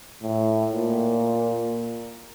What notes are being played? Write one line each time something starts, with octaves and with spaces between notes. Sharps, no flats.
A2
A#2